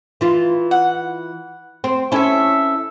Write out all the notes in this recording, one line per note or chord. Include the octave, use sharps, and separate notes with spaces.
E3 F4
F#5
C4 C5
C#4 E4 A4 E5